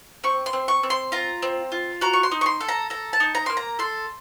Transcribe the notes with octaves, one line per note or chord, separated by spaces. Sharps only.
C4 C#6
C6
C4
C#6
C4
C6
F4 A#5
C4
F4
F#4 A#5
C#6
C6
D#4
C#6
C6
A4
A#5
A4 A#5
A5
D#4
A#5
A#3 C6
A#5
A4 C6